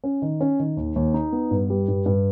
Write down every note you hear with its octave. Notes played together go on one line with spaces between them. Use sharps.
C#4
D#3
C#4
D#3
D#2
D#2
D#4
B3
G2
G3
G2
G2